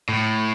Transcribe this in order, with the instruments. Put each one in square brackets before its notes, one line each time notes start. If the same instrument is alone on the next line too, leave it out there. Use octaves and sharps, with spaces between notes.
[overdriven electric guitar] A2